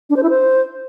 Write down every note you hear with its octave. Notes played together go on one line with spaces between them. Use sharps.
D4
C5
E4
C5